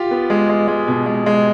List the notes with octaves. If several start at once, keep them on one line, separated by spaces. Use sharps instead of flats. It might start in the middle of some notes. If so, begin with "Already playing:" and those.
Already playing: F4 G4
B3
G#3
G#3
G#3
B2
G#3
G#3